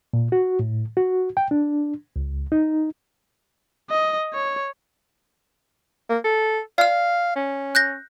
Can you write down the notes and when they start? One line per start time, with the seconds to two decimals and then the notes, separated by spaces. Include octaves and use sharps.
0.13 A#2
0.32 F#4
0.59 A2
0.97 F#4
1.37 G5
1.51 D4
2.16 C#2
2.52 D#4
3.90 D#5
4.33 C#5
6.10 A#3
6.24 A4
6.78 D5 F5 F6
7.36 C#4
7.75 F#6 G6 A#6